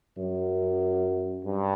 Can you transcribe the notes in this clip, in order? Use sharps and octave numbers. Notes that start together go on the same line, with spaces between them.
F#2
G2